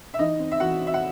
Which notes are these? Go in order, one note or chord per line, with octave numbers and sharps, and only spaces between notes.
E5
E3 D#4 D#5
C4
E5
E3 F#4 F#5
C4
E5
F#5